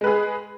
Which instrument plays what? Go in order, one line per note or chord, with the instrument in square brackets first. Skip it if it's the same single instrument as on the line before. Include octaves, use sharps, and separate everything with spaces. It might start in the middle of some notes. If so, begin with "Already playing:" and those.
[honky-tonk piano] G#3
B4
G#4